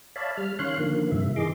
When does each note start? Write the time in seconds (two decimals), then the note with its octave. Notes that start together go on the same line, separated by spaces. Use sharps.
0.16 C#5 D5 E5 F5 A5 B5
0.37 G3 F6
0.59 D#3 C#4 C#5 F5 C6 F#6
0.79 D3 D#3 F3 A#3
1.11 G2 C3 E5
1.36 D#3 E3 G#4 D#5 C6 D6